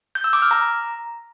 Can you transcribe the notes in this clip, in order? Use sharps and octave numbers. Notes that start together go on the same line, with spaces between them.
G6
E6
D6
F6
A#5